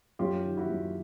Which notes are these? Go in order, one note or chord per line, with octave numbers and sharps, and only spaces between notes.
F#2 F4 G4
D#3
E4 F#4
F#2